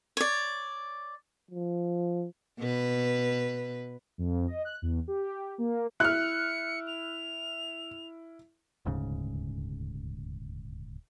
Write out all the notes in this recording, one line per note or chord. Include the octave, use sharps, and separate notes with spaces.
C#5 D5
F3
B2 B4
F2
D#5
F#6
E2
G4
A#3
E4 F6 F#6 C#7
F7
D#1 D2 G#2 C#3